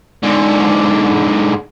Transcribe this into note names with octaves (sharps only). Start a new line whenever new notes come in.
G#2 D3